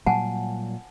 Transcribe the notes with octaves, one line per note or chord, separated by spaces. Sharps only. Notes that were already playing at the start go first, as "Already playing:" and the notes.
A#2 F#3 G3 F#5 G#5 A5